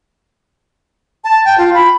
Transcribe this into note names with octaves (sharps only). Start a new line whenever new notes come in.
A5
G5
F4
B5